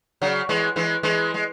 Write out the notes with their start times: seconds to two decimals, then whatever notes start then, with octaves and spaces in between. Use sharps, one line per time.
0.22 C#3 F#3
0.49 E3 G#3
0.76 E3 G#3
1.03 E3 G#3
1.34 G#3